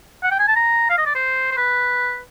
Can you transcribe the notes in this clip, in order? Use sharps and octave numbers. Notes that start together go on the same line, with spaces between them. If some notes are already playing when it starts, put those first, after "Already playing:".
F#5
G5
G#5
A5
A#5
F5
D#5
D5
C5
C5
B4